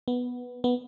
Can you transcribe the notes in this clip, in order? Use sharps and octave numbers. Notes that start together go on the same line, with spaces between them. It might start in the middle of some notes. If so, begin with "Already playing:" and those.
B3
B3